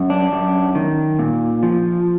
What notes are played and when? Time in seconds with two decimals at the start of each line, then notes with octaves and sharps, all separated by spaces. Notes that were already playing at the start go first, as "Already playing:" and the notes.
Already playing: F#2
0.10 D4
0.32 F#2
0.75 D#3
1.19 A#2
1.63 F3